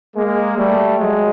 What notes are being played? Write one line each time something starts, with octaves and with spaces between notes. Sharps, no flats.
G#3 A#3
G3 A3
F#3 G#3